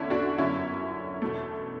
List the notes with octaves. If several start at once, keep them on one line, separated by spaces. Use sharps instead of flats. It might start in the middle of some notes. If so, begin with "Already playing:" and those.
Already playing: E2 D3 A3 C#4 D4 E4
D4 F#4
G1 F#2 D3 C#4 E4
E2 B2 A3